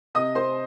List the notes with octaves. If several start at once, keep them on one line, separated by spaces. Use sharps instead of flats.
C3 D#5 D#6
C5 C6